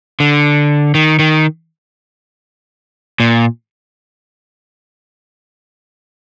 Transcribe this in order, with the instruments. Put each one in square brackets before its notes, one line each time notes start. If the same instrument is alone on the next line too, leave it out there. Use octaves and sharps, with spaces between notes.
[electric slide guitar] D3
D#3
D#3
A#2